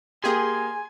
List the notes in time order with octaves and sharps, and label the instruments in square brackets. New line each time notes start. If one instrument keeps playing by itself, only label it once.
[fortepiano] A#3 G4 [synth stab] G#4 [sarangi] G#5 [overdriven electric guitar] C6